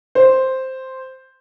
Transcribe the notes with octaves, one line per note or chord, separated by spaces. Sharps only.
C5